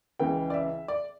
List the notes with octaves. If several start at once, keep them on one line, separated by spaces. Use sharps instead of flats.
C#2 C#3 E3 G5
D5
E5
D5